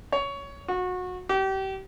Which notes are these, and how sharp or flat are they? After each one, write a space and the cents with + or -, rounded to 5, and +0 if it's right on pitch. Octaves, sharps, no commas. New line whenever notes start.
C#5 +15
F#4 -25
G4 -30